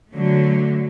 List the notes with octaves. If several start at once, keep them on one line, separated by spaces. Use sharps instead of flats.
D3 F#3 A3